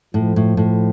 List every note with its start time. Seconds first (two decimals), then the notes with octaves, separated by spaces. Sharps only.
0.14 A2 F3
0.36 A2
0.57 A2